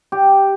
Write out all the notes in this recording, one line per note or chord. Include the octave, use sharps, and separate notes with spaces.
G4